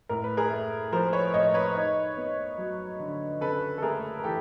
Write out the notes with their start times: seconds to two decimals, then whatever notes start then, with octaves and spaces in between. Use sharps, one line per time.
0.09 A2 A#4
0.24 B4
0.37 G#4 A#4
0.50 A3
0.92 F3 A#4 C5
1.13 B4 C#5
1.34 A2 C#5 D#5
1.54 B4 C#5
1.75 D#4
2.17 B3
2.58 F#3
3.00 D3
3.41 C#3 A4 B4
3.78 A4
3.82 A3 G#4 A#4
4.19 A#4
4.24 E3 G4 A4